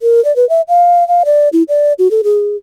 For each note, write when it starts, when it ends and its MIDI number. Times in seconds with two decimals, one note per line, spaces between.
0.01 0.23 70
0.25 0.34 74
0.36 0.47 71
0.49 0.62 76
0.68 1.07 77
1.08 1.23 77
1.25 1.49 74
1.53 1.63 64
1.69 1.93 74
1.99 2.10 66
2.11 2.21 69
2.24 2.56 68